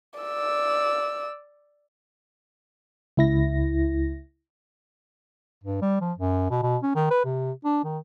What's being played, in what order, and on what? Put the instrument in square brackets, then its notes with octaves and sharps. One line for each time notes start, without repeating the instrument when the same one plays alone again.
[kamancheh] D5 E6
[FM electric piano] C#2 E4 A#6
[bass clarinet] G2
G3
F3
F#2
B2
B2
C#4
D#3
B4
C3
D4
D#3